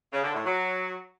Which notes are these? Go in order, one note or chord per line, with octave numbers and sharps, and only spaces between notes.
C#3
D3
A2
F#3